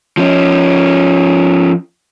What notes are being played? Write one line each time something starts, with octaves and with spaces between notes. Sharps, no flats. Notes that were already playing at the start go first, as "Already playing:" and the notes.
F3 C#4